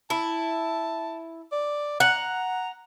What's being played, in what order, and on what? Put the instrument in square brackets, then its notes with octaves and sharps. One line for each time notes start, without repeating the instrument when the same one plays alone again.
[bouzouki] E4 [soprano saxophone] A5
[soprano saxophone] D5
[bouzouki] F#5 [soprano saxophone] A#5